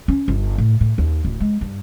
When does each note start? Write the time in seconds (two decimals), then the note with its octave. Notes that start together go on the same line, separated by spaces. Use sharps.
0.08 C#4
0.28 G1
0.58 A2
0.81 A2
0.98 D#2
1.25 D1
1.40 G#3
1.61 G2